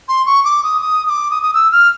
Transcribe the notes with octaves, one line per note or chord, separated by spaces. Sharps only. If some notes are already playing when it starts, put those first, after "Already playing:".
C6
C#6
D6
D#6
D#6
D#6
D6
D#6
D#6
E6
F6